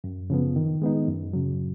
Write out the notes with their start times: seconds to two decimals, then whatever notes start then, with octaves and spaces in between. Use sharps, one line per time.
0.04 F#2
0.30 C#3 F3 B3
0.56 D#3
0.82 G#3 B3 D#4
1.08 F#2
1.33 C#3 F#3